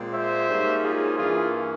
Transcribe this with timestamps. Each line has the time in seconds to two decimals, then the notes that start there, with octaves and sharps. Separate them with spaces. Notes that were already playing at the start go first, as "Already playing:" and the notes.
Already playing: A#2 G#3 C4
0.14 C5 E5
0.49 G#2 G3 A#3 C#4
0.83 F4 G#4
1.18 G2 E3 A#3 C#4 F4 G#4